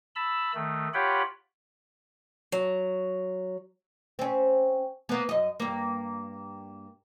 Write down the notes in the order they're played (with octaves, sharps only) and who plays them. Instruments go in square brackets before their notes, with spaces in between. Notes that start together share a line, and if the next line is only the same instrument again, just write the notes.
[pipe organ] A5 B5 E6
D#3 A3
F4 G4 C#5 F#5 G5 B5
[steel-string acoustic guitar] F#3
[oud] C4 C#4
A#3 B3
F#2 D#5
G2 A#3